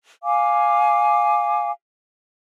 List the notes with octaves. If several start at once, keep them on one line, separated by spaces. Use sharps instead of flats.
F5 G#5 D6